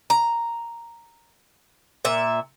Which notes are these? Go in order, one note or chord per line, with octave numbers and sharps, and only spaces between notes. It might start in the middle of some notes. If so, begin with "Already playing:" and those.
A#5
A#2 E5